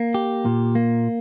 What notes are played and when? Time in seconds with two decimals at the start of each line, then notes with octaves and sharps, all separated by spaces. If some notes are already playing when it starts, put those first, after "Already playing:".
Already playing: A#3
0.14 G4
0.45 A#2
0.75 A#3